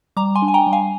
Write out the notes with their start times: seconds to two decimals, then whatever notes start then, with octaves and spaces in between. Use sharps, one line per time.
0.17 G3 A#5 D6
0.35 G#5 C6
0.42 D4
0.48 G#5
0.54 G5 A#5
0.67 G3
0.73 F5 G#5